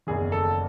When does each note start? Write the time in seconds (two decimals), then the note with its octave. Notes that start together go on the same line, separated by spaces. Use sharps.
0.07 F#1 E2 D#3 G#4
0.32 A4